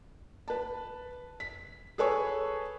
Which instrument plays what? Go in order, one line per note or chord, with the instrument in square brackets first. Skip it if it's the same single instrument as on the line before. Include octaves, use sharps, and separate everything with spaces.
[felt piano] B4 A5
B6
G#4 A4 B4 C#5 G#5 C#6